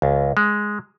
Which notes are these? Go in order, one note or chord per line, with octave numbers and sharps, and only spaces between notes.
C#2
G#3